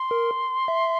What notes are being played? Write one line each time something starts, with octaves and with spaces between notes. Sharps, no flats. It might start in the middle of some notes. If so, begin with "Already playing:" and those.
Already playing: C6
A#4
E5